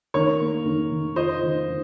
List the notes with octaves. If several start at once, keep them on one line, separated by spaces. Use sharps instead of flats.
D#3 A#4 C#5
A#3
D#3
D#3
F4 C5 D#5
D#3
D#3